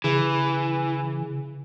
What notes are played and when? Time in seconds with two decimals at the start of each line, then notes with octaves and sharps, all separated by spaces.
0.04 C#3 E3